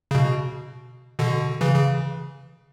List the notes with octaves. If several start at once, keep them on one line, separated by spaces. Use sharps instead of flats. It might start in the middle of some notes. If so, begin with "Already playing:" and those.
C#3
B2
B2 D3
C#3 E3
C#3